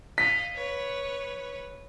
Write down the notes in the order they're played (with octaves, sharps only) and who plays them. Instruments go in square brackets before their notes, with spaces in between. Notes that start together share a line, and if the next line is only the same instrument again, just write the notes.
[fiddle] D#5 F5 [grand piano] B6
[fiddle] B4 C#5